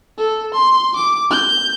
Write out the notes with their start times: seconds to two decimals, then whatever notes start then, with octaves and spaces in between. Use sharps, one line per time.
0.18 A4
0.54 C6
0.96 D6
1.31 G6